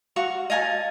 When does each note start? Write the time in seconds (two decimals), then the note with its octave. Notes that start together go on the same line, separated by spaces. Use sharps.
0.16 F#4 F5 C#6
0.50 D#5 F5 G#5 A5